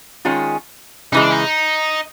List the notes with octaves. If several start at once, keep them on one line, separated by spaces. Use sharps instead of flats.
D#3 G#3 C#4 F4
C#3 E3 G#3 D#4
D4
D#4